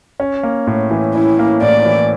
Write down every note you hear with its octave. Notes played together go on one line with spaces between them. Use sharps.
C#4
A#3
A2
E3
C#4 E4
A#3
A2 D5
E3